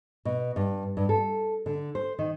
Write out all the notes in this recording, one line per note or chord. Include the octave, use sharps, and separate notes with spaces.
B2
G2
G2
A4
D3
C5
D#3